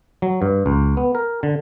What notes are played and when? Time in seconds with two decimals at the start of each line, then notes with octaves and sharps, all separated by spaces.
0.22 F#3
0.42 G2
0.66 C#2
0.97 B3
1.15 A#4
1.43 D3